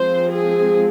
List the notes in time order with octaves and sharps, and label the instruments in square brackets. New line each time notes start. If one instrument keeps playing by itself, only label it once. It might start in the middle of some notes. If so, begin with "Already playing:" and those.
Already playing: [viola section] F3 G#3 C4 C5
G#4